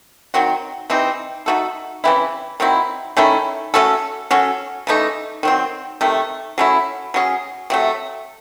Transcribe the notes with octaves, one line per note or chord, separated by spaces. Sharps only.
D#3 F#3 C4 F#4
C3 E3 C4 D#4
A3 D#4 F#4 A4
C#3 E3 C4 E4
D#3 F#3 C4 E4
D#3 A3 C#4 E4
A3 C#4 F#4 A4
F#3 C#4 F#4 A4
C#3 E3 A3 D#4
D#3 F#3 C4
C3 D#3 A3
F#3 A3 C#4 E4
F#3 C#4 G#4
C3 F#3 A3